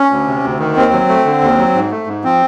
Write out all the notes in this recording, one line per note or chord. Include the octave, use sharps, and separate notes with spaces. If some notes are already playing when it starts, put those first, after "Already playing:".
Already playing: C#4
D2
C3
D2
D#3
D#2 C4
F#3
A3
D3
D#2
F#3
G#2
A3
G#2
F3 C4